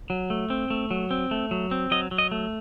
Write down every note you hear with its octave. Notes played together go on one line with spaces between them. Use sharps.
F#3
A3
C4
A3
F#3
C4
A3
F#3
C4
F#3 D#5
F#3
D#5
A3